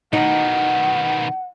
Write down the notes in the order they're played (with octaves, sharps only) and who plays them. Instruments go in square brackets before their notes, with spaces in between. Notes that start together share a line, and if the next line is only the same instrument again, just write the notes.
[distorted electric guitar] B2 D#3 [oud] D#4 [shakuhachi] F#5